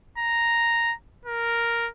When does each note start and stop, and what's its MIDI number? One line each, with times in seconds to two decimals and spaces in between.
0.18 0.94 82
1.26 1.88 70